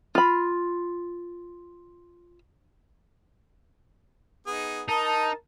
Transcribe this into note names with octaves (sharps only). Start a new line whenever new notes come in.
F4 B5
B3 D#4 G#4
D#4 A#4 D#5 A5 A#5